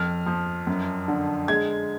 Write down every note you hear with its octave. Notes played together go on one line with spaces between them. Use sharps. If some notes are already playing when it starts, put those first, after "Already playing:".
Already playing: F2 F6
F3
F#2
D3
G#3 G#6